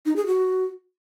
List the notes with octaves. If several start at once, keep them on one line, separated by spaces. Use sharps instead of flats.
D#4
G#4
F#4